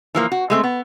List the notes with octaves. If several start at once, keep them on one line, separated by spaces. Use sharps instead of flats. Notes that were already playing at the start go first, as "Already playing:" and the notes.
E3 F3 A#3
F#4
G#3 A3 C4
B3